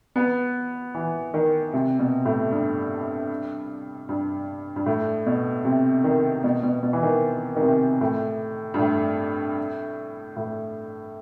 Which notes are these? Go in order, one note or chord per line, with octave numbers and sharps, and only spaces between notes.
B3
E3
D#3
C3
B2
A2
G2
G2
G2
A2
B2
C3
D#3
B2
B2
B2
E3
D#3
D#3
C3
A2
G2
A2
A2